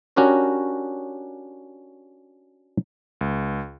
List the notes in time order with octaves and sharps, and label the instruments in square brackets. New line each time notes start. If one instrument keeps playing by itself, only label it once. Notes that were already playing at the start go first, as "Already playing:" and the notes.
[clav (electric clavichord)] C#4 D4 F#4 G4 A#4 C#5
[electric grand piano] C#2